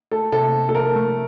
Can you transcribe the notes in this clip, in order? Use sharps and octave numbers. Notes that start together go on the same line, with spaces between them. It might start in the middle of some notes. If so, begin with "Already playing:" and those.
A3 A4
C3 A4
C3
A4
F3 A#4
A3